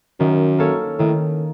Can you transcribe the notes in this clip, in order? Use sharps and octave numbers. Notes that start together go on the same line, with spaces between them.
F#2 D#3
A#3 C#4 A4 C#5
A2 D#3